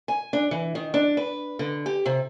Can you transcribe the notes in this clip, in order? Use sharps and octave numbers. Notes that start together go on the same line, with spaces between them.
G#5
D4
E3
D#3
D4
B4
D3
G4
C3